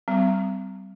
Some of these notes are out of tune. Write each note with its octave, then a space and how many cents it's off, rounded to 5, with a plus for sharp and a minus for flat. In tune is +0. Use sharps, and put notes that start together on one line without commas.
G3 -20 C4 -25